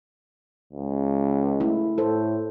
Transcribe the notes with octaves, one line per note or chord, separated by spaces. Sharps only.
C#2
A3 E4
A2 A4 C5